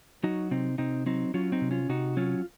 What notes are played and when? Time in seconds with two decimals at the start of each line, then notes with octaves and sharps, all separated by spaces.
0.23 F#3 D#4 F#4
0.51 C3 C4 D#4
0.78 C3 C4 D#4
1.06 F#3 C4 D#4
1.34 F#3 C#4 F4
1.52 C4 D#4
1.61 C3
1.71 C#4 F4
1.89 C3 D#4 F#4
2.17 F#3 C#4 F4